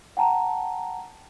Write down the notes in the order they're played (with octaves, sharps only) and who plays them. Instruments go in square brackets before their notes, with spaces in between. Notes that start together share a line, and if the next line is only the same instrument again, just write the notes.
[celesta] F#5 G5 A5 A#5